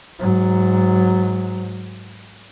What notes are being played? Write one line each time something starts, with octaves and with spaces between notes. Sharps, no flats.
G#2 F#3